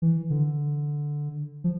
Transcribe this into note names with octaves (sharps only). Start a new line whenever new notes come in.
E3
D3
F3